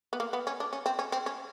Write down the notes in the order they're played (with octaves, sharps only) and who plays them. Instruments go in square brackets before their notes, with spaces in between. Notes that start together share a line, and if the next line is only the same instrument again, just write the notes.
[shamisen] B3
A#3
B3
C#4
D4
C#4
C4
C#4
C4
C#4